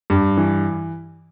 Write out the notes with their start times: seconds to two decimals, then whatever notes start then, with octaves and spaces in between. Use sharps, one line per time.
0.10 G2
0.37 E3